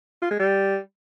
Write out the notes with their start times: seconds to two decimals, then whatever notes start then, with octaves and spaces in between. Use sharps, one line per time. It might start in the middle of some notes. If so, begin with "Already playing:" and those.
0.22 F4
0.31 G#3
0.40 G3